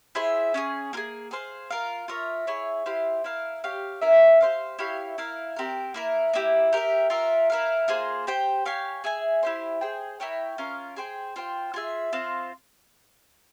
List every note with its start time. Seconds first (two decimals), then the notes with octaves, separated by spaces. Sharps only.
0.15 E4 G#4 C5 E5
0.54 C#4 E4 G#4
0.93 A#3 F4
0.97 G#4
1.31 G#4 C5 F5
1.70 F4 A#4 F5
2.08 F4 A#4 C#5 E5
2.47 E4 G#4 C#5
2.86 E4 G4 C5 F5
3.24 E4 A#4 F5
3.64 G4 C#5 F5
4.01 C#4 E4 A#4 E5
4.41 G4 C5 F5
4.79 E4 G4 C#5 F5
5.18 E4 A#4 F5
5.56 C4 G4 A#4
5.94 A#3 E4 A#4
6.33 A#3 E4 G4
6.73 G4 A#4 E5
7.10 F4 A#4 E5
7.50 E4 A#4 F5
7.88 A#3 F4 G#4 C5
8.27 G4 C5 G5
8.65 G4 C#5 F5 G#5
9.04 G#4 E5 G#5
9.43 E4 G4 C5
9.81 G#4 C5 G5
10.20 E4 A#4 C#5 G5
10.58 C#4 F4 A#4 F5
10.96 G#4 C5 G5
11.36 F4 C5 G5
11.74 F4 G#4 E5
12.13 C4 F4 C5 F5